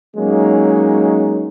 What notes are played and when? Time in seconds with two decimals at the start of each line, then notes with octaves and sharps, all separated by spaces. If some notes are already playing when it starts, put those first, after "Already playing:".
0.17 F#3 G#3 A#3 C#4 D#4